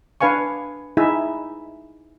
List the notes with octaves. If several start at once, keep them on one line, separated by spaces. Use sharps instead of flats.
D4 B4 F5 G#5 C#6
D#4 E4 G#4 E5